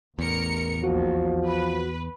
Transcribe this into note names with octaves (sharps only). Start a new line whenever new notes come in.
A1 E2 A#4 C#7
A#1 D#2 F3 F#4
B4